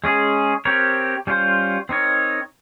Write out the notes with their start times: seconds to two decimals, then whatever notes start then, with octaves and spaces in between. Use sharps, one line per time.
0.04 G#3 C#4 G#4
0.65 C4 G4 A#4 C#5
1.27 G3 C#4 F4 C5
1.89 C4 D#4 A#4 C#5